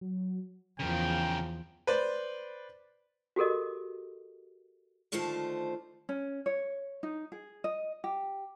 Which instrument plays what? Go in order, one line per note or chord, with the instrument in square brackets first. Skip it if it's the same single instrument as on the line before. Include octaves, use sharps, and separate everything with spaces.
[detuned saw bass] F#3
[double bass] E2 F3 [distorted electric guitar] C#3 A#4 [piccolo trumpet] G5
[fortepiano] B4 C5 D5
[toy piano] F#4 G4 A4 A#4 D#5
[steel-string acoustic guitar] D3 D#3 F3 A3 C5 A5
[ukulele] C#4
C#5
D#4
G#4
D#5
G4